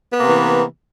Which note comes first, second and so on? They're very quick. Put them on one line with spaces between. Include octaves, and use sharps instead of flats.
B3 A#3 C3 E3